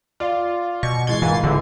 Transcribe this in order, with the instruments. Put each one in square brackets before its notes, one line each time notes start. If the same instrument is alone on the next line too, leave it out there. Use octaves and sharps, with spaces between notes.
[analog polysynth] F4 [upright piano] D5 F5
[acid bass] B2 [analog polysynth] C#6
[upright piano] E3 G#3 G7 [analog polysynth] G#6 A6 C7
[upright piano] G#2 A#3 F4 [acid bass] E3
[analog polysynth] A1 E3 [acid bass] D3 [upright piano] G#3